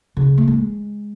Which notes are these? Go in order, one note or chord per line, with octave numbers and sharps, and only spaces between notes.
C#3
A3
G#3